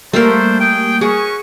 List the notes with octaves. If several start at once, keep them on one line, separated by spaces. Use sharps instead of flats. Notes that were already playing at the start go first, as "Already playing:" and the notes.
G3 A3 A#3 D4 A#4 C5
G#4 G5
C#4 F#4 G#4 C#6